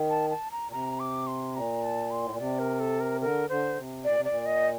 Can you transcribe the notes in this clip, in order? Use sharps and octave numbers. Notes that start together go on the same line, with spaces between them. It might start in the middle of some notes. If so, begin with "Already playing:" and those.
Already playing: D#3
A5
A5
A#5
A#2
C3 A#5
D6
C6
A#2 A#5
A5
C6
A2
A#2
C3 D5
A#4
A4
A#4
D3 A#4
D3 C5
C3
A#2 D5
C3
A#2 D5
D#5